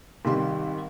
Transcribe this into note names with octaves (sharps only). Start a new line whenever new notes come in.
G#1 C3 D#3 G3 G4 C6